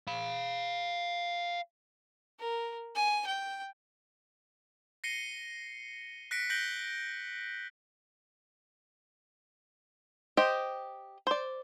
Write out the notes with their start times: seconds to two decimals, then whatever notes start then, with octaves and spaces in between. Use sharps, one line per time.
0.08 F5 B5
2.39 A#4
2.95 G#5
3.26 G5
5.04 A#6 C7 C#7 D#7 G7
6.31 F#6 A#6 B6 C#7 D7
6.50 F#6 G6 A#6 D7 F#7 G7
10.37 G4 C5 D#5 G5
11.27 C5 D5